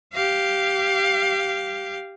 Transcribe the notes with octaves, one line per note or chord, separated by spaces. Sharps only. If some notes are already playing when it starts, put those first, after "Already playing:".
G4 F5